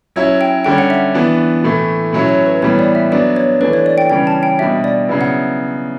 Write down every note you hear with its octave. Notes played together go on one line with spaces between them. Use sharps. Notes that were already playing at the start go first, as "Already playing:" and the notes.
F#3 C#4 E4 C#5
G5
D3 G3 C#4 G5
F#5
E5
E3 B3 D4
A2 E3 A3 E4
A2 F#3 C#4 E4
C#5
B4
A2 E3 G3 B3 C#5
D5
E5
F#3 B3 D4 D5
C#5
E3 A3 D4 B4
C#5
D5
G5
C#3 E3 G3 C#4 G5
A5
G5
B2 G3 D4 E5
D5
C#3 F#3 B3 E4
F#5